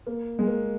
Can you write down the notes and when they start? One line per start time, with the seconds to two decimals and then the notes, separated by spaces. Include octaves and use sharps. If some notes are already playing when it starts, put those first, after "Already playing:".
0.07 A#3
0.39 G#3
0.47 A#3